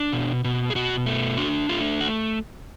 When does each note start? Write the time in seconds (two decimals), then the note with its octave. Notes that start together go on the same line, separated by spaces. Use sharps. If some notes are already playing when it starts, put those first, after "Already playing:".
Already playing: D4
0.12 B2
0.44 B2
0.70 G#4
0.75 B2 F#4
1.06 A3
1.38 D4 F#4
1.69 A3 F4
2.00 F#4